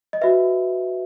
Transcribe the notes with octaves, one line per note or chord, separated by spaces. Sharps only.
D#5
F#4 B4 E5